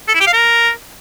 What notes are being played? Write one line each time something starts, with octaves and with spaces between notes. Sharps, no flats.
A4
E4
G4
F5
A#4